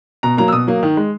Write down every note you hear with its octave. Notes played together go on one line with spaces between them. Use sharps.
B2 A#5
F#3 A#3 A#5
E6
B2 D#6
F#3 A#3
D#3
G#3